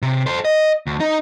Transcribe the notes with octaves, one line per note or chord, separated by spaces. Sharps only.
C3
A4 C5
D#5
D2
D#4